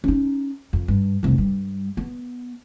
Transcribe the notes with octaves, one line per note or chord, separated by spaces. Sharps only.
C#4 D#4
F2
G2
F1 C2
G2 G3
B3